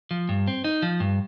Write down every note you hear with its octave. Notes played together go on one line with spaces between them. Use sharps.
F3
G2
C4
D#4
F3
G2